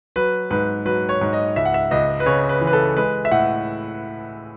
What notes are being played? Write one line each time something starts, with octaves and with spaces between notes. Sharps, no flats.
F#3 B4
G#2 B4
F#3 B4
C#5
G#2
D#5
C#2 E5
F#5
E5
C#2 D#5
B4
C#3 C#5
B4
E3
B4
A4
G#3 B4
E5
A2 F#5